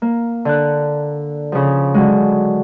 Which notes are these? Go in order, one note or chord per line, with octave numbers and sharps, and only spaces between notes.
A#3
D3 F#6
C#3 F3
D3 F#3 G#3